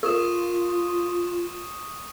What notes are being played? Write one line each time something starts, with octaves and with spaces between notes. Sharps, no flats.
F4 A#4 C#6 D#6 E7